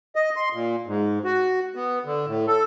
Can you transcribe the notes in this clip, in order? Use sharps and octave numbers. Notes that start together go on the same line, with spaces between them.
D#5
C6
A#2
G#2
F#4
B3
D3
A2
A4